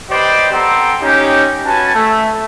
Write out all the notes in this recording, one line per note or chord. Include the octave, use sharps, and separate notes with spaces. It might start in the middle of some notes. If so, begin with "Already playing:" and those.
G4 B4 C5 D5 D#5
B3 C4 A4 G5 A#5 C6
C#4 D#4 G4
C#4 F#4 B4 G#5 A5
A3